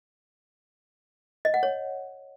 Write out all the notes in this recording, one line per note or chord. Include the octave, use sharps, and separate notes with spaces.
D#5
F#5
C#5